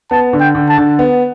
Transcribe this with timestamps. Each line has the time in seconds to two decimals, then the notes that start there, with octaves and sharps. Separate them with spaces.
0.11 B3 A5
0.33 D3
0.40 G5
0.55 D3
0.69 A5
0.78 D3
0.99 B3